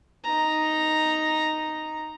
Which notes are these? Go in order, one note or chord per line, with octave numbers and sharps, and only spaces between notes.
D#4 A#5